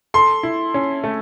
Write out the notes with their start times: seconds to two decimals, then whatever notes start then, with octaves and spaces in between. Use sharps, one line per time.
0.14 A4 C6
0.43 E4
0.74 C#4
1.04 A3